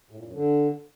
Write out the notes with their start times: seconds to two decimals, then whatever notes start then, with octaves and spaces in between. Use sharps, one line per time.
0.11 A2
0.18 A#2
0.26 F#2
0.34 D3